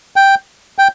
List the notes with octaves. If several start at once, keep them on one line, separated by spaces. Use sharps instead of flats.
G5
G5